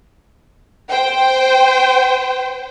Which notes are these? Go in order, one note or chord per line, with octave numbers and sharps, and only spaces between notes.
C5 G5